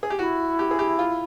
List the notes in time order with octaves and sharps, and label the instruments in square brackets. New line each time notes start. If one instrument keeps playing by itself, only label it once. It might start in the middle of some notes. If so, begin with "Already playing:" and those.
[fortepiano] G#4
G4
[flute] E4 [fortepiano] F#4
[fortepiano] G4
G#4
G4
F4